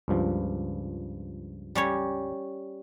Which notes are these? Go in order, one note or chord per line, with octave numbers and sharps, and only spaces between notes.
C#2 G2 F3
G3 C#4 C#5